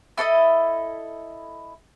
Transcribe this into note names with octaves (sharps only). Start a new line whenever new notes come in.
E4 A4 D5 D#5